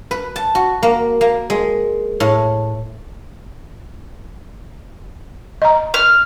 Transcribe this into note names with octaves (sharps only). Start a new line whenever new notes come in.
B4
A5
F#4
A#3
A#3
G#3
A2
D#5 A#5
F6